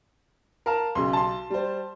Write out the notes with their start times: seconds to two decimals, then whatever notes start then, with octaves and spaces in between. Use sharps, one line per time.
0.66 A#4 F5 A5
0.95 B1 C#3 C6
1.13 A5 C6
1.50 G3 C5